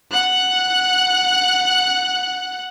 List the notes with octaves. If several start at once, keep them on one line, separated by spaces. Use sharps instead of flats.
F#5 F#6